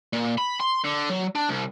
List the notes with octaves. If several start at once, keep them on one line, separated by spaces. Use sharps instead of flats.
A#2
B5
C6
D3
F#3
D4
C2